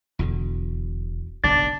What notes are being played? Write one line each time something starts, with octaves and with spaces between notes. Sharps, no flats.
D#1 E2 B2 D3
F#1 B1 G2 D4 A6